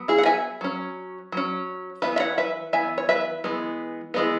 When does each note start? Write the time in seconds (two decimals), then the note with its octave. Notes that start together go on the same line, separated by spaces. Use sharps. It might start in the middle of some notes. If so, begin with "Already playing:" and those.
Already playing: F#3 B3
0.08 E4 G#4
0.18 F#5
0.26 E5 G#5
0.61 F#3 C#4
1.32 F#3 C#4
2.02 E3 B3 B4 E5
2.16 E5
2.20 C#5 F#5
2.38 B4 E5
2.73 E3 B3 E5 G#5
2.98 C#5
3.09 B4 E5
3.44 E3 G#3 B3
4.14 E3 G#3 B3